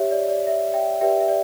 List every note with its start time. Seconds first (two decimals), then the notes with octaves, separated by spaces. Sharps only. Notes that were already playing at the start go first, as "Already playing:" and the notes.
Already playing: G4 C#5 E5
0.11 D5
0.29 D5
0.47 E5
0.74 E5 G5
1.01 G4 B4 D5 E5 G5
1.20 E5
1.28 D5